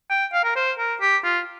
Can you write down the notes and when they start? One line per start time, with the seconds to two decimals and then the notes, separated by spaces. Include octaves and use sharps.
0.10 G5
0.33 F5
0.44 A#4
0.56 C5
0.78 A#4
1.01 G4
1.24 F4